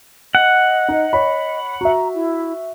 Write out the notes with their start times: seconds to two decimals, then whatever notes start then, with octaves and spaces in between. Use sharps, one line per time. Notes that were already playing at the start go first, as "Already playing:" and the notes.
0.35 D#5 F#5
0.88 D#4
1.13 C#5 B5
1.81 F#4 E5 A#5
2.15 E4